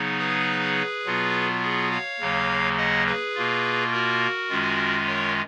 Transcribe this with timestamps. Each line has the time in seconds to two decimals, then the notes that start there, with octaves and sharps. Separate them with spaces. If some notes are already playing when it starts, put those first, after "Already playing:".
Already playing: C#3 F#3 B3 D#4
0.19 G#4 B4
1.06 B2 F#3 B3 F4
1.63 G#4
1.91 C#5 F5
2.20 D#2 C#3 F#3 A#3
2.77 D#5 F#5
3.06 G#4 B4
3.35 B2 A#3 F4
3.92 F#4 A#4
4.50 F#2 D#3 G#3 C#4 F4
5.07 A#4 C#5